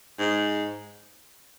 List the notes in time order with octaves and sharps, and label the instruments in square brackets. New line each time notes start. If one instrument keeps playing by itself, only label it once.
[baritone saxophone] G#2